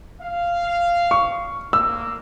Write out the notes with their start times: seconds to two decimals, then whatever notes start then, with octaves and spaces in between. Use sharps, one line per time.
0.22 F5
1.11 C#6
1.73 A#3 E6